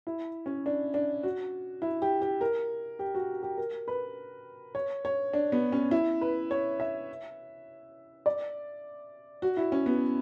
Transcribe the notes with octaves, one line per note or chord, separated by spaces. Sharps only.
E4
C#4
D4
D4
F#4
E4
G4
G4
A#4
G4
F#4
G4
A#4
B4
C#5
C#5
D4
B3
C#4
E4
B4
C#5
E5
D5
F#4
E4
C#4
B3